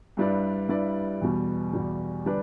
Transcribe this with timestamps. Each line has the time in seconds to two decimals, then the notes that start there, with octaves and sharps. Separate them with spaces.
0.17 G2 G3 E4 B4 D5
0.69 G2 G3 E4 B4 D5
1.21 E2 B2 G3
1.73 E2 B2 G3
2.26 D3 G3 D4 B4 D5